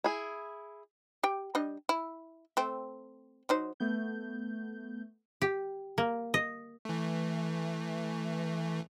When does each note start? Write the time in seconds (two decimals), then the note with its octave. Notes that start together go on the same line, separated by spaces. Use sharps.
0.04 E4 G#4
1.23 G4 G5
1.55 G3 D4 D#5
1.89 E4
2.57 A3 C4
3.49 F#3 D#4 C5
3.80 A3 B3 G6
5.42 G4
5.98 A#3
6.34 D#5
6.85 E3 A3